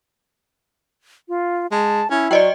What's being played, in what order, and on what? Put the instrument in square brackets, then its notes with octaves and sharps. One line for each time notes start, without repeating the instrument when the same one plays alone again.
[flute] F4
[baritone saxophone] G#3 [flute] A5
[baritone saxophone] C#4 [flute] E4
[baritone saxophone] F#3 [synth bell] D5 D#5 G5